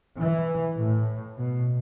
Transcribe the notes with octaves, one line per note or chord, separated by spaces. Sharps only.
E3
A2
B2